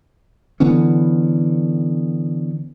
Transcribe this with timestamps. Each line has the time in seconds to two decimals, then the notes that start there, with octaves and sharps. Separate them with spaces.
0.60 D3 E3 B3 C#4